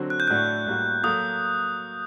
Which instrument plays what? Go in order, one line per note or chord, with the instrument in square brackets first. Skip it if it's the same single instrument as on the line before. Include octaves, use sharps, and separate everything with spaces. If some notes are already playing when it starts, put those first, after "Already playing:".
Already playing: [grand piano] D3 F#3 C4 F#4
[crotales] F#6
G6
[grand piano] A2 A3 D4 F#4 A4 [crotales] F#6
[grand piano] A2 G3 A#3 F#4
[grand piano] F#3 A#3 F#4 A4 [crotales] D#6